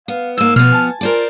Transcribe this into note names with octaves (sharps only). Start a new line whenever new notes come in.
B3 F5
G#2 A#3 E6
B2 F3 B3 F6
G#5 A5
F4 A#4 C5 D5